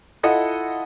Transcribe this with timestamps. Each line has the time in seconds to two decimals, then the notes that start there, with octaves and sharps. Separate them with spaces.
0.23 E4 F4 A4 D#5 F#5